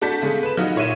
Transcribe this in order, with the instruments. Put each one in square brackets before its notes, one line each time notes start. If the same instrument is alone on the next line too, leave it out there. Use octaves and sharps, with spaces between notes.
[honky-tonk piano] A3 D4 F#4 A5 G6 B6
C#3 G#3 A3 G#4
B4 E7
F#3 D#4 F4 F#4 D#5
A#2 C#5 E5 D#7 E7